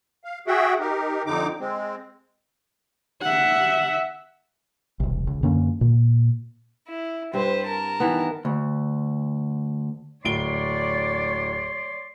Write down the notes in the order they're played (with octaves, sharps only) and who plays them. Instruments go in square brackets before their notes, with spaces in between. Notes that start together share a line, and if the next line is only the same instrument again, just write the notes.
[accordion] F5
F#4 G#4 E5 F#5 G5
D#4 G4 A#4
F2 D3 D#4 D6
G#3 C4
[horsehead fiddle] E5 F#5
[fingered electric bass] E1 C2
C#2
F#2 D3 A#3 C#4
A#2
[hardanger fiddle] E4
[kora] G2 C4 [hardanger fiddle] B4 C5
[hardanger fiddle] A#4 A5
[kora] D#3 E3 B3
[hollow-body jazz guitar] D2
[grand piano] D1 D7 G7 [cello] C#5 D5 [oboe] C6